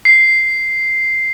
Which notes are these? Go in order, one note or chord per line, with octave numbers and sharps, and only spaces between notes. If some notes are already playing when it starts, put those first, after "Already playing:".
C7